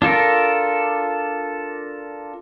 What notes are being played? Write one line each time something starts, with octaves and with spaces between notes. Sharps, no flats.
D4 F4 A4 A#4